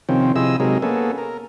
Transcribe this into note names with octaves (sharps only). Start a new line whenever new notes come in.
C3 D#3 F3 C4 C#4
C3 F3 E4 G#4 D#5 E6
C3 F#3 G#3 D#4 G#4 A#4
A#3 B3 C#4 G#4 A4
A#4